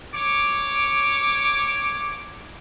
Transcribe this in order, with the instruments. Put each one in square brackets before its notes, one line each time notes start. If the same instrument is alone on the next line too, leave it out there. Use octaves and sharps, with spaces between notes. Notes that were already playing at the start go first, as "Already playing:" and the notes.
[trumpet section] C#5 D6